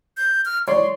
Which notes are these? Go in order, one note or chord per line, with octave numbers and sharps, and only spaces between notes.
G6
F6
C#5 D5 C6